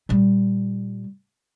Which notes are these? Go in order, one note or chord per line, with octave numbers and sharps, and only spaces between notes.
A#2 G3